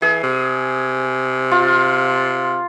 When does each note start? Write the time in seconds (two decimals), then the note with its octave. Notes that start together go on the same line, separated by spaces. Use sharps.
0.02 E3 G#4
0.23 C3
1.51 F4